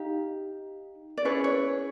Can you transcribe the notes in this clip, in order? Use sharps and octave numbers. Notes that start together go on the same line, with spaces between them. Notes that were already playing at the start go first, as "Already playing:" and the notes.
Already playing: D#4 G4 F5
D5
C#4 E4 G#4 B4 C#5
C#5